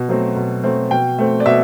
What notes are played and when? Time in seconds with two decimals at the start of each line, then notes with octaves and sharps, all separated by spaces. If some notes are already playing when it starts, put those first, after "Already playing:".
Already playing: B2
0.09 F#3 A3 C4
0.36 B2
0.63 F#3 A3 C4
0.91 B2 G5
1.18 A3 C4
1.40 D5
1.46 B2 E5